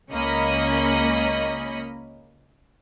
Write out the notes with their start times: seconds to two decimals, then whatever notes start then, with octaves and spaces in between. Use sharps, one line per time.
0.10 C#2 A#3 C#4 D#5 B5